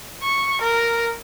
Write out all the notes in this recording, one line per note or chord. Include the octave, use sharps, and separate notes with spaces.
C#6
A#4